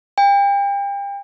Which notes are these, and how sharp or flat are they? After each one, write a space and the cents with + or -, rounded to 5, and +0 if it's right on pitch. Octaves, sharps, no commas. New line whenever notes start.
G5 +35